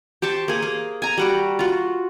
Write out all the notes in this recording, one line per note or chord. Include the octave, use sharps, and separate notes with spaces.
G4 C5 A5 C#6
A#3 G#4
A#3
G#5 A#5
G3 F#4 G4
F4 F#4